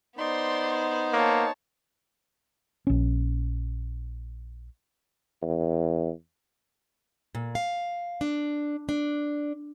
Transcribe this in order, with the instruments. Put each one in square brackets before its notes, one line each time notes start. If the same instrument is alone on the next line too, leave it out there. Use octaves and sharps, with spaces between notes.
[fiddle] B3 C5 [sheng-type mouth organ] D#4 [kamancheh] D5 C6
[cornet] A#3 [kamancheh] C#5 A5
[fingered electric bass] A#1 C#4
[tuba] E2
[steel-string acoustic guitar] A#2
F5
D4
D4